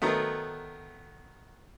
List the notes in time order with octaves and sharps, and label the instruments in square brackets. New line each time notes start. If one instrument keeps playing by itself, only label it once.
[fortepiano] D#3 F#3 A3 B3